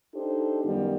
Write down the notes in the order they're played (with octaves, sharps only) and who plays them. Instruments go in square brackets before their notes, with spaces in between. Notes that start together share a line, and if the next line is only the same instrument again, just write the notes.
[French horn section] D4 D#4 G4 A4 C5
F#2 D#3 G3 B3 F4